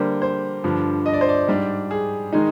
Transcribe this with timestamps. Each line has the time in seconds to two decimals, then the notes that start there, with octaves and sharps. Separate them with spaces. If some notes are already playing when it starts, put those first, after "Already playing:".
Already playing: D3 G3 A#3 C5
0.22 C5
0.64 G2 D3 F3
1.06 D#5
1.14 D5
1.21 C5
1.29 D5
1.48 G#2 G3 D4
1.91 G#4
2.33 D#3 G#3 D#4